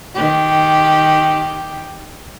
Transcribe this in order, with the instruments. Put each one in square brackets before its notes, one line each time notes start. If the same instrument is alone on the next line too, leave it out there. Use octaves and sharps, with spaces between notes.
[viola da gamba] D#3 G4